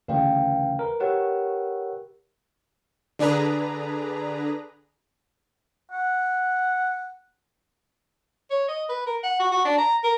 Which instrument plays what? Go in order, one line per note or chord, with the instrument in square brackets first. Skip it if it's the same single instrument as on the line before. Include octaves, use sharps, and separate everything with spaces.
[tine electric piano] D2 C#3 E3 [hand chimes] B4 F5 G5
[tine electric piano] A#4 B4
[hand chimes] G4 A#4 B4 [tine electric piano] C#5 F#5
[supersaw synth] D3 D4 G#4 B4 A#5
[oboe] F#5
[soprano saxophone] C#5
D#5
B4
A#4
F#5
F#4
F#4
D4
A#5
A#4